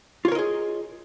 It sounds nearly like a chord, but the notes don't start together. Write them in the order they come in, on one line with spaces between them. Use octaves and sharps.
F4 C#5 A#4 D#5 G#4